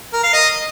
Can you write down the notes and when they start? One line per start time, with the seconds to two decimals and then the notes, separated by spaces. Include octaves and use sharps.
0.13 A#4
0.23 F5
0.33 D#5